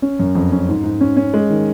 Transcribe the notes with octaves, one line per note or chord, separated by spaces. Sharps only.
C#4
F#2
F2
C#4
G#2
G#2
C#4
C#4
G#3
D#3